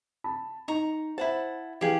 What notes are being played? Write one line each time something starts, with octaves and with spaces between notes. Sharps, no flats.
A5 B5
D#4 A#5 C#6
E4 C5 F#5 A5 B5
E3 G4 G#4 F5 F#7